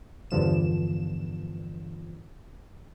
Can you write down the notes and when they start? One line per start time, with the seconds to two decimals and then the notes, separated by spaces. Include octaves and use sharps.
0.31 E2 G2 D3 F3 E7